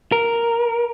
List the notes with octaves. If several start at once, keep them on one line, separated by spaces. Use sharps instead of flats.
A#4